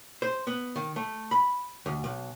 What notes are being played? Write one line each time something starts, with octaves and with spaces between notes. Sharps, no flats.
C5
B3
D#3
A3
B5
D2
B1